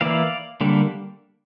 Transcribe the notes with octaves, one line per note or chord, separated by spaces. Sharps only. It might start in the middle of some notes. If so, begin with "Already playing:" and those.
E3 A#3 E4 D5 F5
D3 G3 A#3 D4